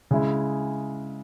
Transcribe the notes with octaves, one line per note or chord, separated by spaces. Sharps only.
C#3 G#3 E4